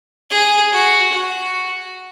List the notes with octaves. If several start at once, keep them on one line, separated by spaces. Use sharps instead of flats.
G#4
F#4
F#4